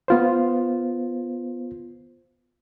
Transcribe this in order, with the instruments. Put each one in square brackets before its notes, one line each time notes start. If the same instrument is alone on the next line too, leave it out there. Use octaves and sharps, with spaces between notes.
[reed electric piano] B3 F4 C5